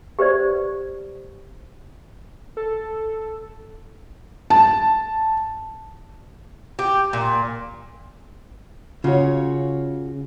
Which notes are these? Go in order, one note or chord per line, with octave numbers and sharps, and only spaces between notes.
G4 B4 C5 D5
A4
A5
G4
A#2
C#3 F4 F#4 C#5